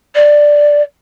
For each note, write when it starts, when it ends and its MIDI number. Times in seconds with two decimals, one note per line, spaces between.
0.15 0.81 74